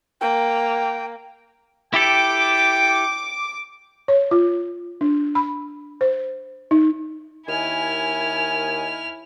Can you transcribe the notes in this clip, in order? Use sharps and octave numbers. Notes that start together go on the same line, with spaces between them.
A#3 G5
E4 G4 A4 G5 D6
C#5
F4
D4
B5
C5
D#4
D#2 D#3 E4 G#5 F6